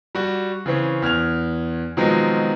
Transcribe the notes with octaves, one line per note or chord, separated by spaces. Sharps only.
G3 F#4
C#3 E3 C4 C#4
E2 F6 G#6 F7
B2 D#3 F3 F#3 G#3 C4